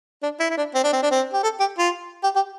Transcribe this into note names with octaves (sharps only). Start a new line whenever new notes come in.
D4
E4
E4
D4
C4
D4
C4
D4
C4
G4
A4
G4
F4
G4
G4